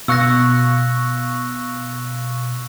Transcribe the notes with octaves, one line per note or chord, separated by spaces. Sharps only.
B2 F5 C#6 E6 F#6 A#6